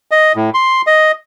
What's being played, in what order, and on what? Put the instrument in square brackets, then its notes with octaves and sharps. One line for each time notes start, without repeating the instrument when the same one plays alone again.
[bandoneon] D#5
A2
C6
D#5